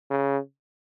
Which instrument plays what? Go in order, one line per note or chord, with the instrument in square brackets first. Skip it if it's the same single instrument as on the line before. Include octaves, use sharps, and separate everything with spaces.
[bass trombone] C#3